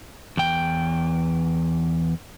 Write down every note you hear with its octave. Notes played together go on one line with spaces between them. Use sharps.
E2 G5